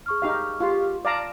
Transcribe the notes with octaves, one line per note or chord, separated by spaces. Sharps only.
G#4 C#6 F6
D#4 G4 F5
F4 G4
D5 F5 A5 A#5